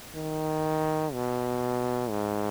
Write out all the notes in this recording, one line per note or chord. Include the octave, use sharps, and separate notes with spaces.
D#3
B2
G#2